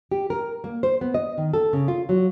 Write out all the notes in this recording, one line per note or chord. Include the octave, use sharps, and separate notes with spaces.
G4
A#4
A#3
C5
B3
D#5
D#3
A4
C#3
F4
F#3